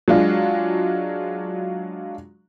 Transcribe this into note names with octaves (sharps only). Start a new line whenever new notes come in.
F#3 G#3 D4 F4